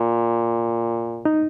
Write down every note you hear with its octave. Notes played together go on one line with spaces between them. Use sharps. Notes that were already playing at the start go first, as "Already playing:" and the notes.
Already playing: A#2
D#4